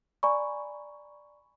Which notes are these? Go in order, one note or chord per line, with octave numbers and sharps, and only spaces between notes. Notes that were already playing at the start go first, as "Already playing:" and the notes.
D5 G#5 A#5 B5 C#6